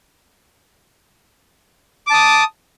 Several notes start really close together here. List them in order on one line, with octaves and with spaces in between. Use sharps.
D6 A5 D#6